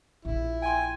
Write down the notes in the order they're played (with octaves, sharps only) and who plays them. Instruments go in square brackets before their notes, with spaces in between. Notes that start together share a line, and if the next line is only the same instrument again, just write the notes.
[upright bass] A#1 A#2 [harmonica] E4
[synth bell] G5 C6 [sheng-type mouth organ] G#5